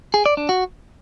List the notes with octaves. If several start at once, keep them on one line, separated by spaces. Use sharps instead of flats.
G#4
D5
D4
F#4